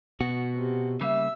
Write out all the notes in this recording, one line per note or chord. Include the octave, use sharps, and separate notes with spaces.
B2 F#4
C3
C#3 G3 A#3 E5 E6